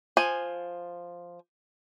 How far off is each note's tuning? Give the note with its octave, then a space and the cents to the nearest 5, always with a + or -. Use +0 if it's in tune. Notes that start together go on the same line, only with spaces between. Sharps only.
F3 +0 G#5 +0